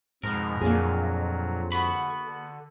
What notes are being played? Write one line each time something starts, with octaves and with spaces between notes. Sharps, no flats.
F2 G#2 B2 F3 A#4
F2 A#2 F#3 A#3 D4 G#4
D3 B3 F#4 B5 C#6
D3